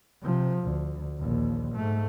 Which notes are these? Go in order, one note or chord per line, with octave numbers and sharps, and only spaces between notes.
C3 F3
D2
A#1 D#2
G#2 A3